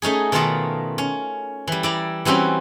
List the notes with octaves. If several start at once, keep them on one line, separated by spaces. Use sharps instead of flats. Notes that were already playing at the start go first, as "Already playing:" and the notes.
A3 C#4 D#4 G#4
B2 D#3 A3 F4 A#4 A5
C#4
E3 G3
E4 D5 A#5
E3 G3 C4 C#4 F#4